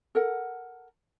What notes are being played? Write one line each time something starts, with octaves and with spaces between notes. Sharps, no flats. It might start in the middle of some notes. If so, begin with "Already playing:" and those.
A4 A#4 F#5